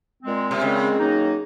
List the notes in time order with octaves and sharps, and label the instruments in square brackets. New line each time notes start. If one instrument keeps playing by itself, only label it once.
[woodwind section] A#2 G#3 C4
[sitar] C3
[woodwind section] A#2 G#3 C4 [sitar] C#3
[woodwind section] F#2 D#3 F#3 A#3 D#4